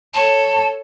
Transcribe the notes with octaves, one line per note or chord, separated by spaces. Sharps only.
A4 C#5 A5